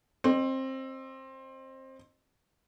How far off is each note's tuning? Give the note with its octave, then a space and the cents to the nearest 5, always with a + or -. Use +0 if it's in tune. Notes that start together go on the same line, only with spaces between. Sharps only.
C4 +20 D#5 -25